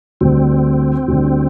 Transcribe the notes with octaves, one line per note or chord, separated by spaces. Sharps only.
D2 D3 G3 C4
D2 D3 G3